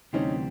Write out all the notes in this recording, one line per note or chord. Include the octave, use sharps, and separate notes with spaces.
D2 C3 E3 G3 C4 C#4 D#4